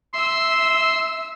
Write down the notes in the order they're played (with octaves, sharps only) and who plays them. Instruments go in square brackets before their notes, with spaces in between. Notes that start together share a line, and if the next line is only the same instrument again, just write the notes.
[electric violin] E5 E6 [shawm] C6